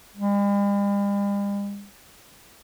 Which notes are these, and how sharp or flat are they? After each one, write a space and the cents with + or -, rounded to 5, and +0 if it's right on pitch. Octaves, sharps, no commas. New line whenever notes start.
G3 +45